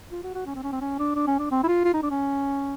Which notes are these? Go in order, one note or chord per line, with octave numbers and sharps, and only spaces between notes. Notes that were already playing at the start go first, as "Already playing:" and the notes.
F4
F#4
F#4
C#4
C4
C#4
C4
C#4
D4
D4
C#4
D4
C4
E4
F4
F4
D#4
D4
C#4